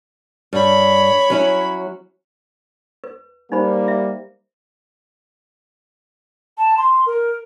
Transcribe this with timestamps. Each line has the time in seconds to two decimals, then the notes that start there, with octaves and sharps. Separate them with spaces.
0.53 G2 C#5 B5
1.30 F#3 C#4 E4
3.04 B4
3.52 G3 A#3 D#4 C5 B5
3.88 E5
6.58 A5
6.78 C6
7.06 A#4